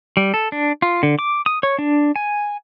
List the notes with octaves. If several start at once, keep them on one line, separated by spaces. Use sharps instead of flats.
G3
A4
D4
F4
D3
D6
D#6
C#5
D4
G#5